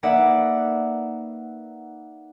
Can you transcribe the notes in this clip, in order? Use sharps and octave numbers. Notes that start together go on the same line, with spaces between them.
A#3 D#4 B4 D5 E5 F#5